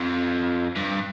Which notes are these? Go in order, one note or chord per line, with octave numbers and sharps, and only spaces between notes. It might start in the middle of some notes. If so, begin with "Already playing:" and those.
Already playing: F2
G2